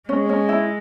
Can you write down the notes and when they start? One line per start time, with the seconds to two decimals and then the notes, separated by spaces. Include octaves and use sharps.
0.09 G#3 C#4
0.29 C#4
0.49 E4